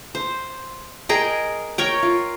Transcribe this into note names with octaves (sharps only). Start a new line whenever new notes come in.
C5
G#4 A#4 D#5 G5
A#4 C#5 G5
F4